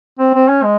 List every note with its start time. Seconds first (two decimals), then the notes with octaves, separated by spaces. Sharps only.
0.19 C4
0.34 C4
0.48 C#4
0.63 G#3